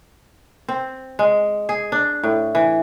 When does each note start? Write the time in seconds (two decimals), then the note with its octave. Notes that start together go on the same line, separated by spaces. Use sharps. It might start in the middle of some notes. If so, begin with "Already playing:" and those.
0.68 C4
1.19 G#3
1.69 G#4
1.92 D4
2.23 A2
2.55 E3